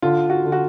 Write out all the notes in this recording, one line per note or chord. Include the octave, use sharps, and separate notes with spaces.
D3 F4
F#4
D3
F#4